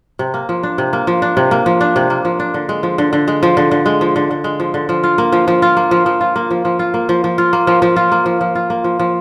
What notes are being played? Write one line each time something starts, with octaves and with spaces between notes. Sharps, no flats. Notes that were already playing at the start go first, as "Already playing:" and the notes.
C3
A#3
F3
D4
C3
A#3
F3
D4
C3
A#3
F3
D4
C3
A#3
F3
D4
D3
G#3
F3
D3
D3
G#3
F3
D3
D3
G#3
F3
D3
D3
G#3
F3
D3
F3
F4
A#3
F3
F3
F4
A#3
F3
F3
F4
A#3
F3
F3
F4
A#3
F3
F3
F4
A#3
F3
F3
F4
A#3
F3
F3
F4
A#3
F3
F3